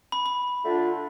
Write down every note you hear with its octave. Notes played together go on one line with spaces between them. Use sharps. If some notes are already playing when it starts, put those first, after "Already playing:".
B5
B5
D3 A3 D4 F4